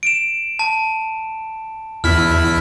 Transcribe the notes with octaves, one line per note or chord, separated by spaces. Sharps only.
D7 E7
A5
E2 E4 F6 B6